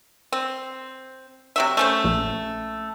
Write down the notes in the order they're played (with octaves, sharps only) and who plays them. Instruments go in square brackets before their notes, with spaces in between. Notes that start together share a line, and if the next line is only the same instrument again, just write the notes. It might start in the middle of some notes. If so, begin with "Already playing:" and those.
[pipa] C4
C3 F#3 E5
A3 C#4 C5
[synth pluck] A#1